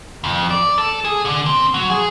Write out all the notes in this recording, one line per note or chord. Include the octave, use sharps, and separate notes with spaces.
F2
D5
A4
G#4
D3
C4
F#3
G#4